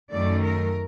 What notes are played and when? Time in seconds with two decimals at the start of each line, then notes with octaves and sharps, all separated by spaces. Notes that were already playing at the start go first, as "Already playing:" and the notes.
0.11 F#2 D#3 A3 D5
0.43 A#4